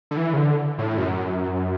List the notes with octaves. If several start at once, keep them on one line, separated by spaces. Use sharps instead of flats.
D3
E3
C#3
D3
A2
F#2